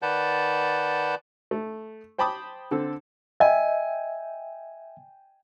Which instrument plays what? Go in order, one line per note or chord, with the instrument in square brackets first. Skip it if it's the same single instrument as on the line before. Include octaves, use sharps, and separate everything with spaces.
[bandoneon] D#3 B4 D5 F#5 A5 G6
[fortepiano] A3
C5 G5 A5 B5 D6 D#6
D3 C4 A4
[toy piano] D#5 [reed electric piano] E5 [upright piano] G5 G#5